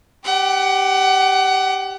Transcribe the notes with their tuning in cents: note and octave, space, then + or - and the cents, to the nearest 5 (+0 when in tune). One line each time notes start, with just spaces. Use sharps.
G4 +0 F#5 +30